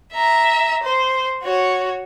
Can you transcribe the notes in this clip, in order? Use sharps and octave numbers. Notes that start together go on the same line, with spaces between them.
E5 A#5
C5
F#4 C#5